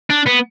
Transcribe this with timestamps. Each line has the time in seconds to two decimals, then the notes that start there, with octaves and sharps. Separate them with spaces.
0.10 D4
0.26 B3